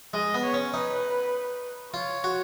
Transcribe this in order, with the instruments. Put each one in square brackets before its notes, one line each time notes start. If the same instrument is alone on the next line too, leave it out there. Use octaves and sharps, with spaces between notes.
[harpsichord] G#3 [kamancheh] D#5
[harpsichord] B3
[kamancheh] C#5
[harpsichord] C#4
[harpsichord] D#4 [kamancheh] B4
[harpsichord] F4 [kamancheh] C#5
[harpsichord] F#4